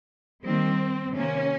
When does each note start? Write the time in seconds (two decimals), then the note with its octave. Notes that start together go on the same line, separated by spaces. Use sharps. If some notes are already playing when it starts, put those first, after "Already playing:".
0.44 D#3 G3 A#3 C4
1.13 C3 D#3 A#3 C#4